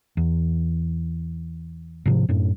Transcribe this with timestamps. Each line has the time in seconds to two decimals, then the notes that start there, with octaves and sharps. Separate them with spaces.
0.17 E2
2.06 G#2 C3 F3
2.29 F#2 A2